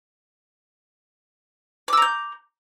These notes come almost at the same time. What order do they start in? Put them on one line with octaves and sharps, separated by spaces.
D6 E6 A#5 G6